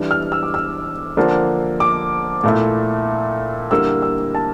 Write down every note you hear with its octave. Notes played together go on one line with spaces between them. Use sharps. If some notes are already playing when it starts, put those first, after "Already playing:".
Already playing: E3 G3 D4
F6
E6
D6
E6
D3 F3 A#3 D4
D6
A#2 A3 E4
D3 G3 A#3 E4 E6
E6
A5